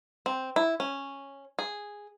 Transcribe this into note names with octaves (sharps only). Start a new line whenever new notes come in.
C4
E4
C#4
G#4